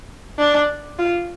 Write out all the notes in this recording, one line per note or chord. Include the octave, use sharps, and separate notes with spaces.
D4
F4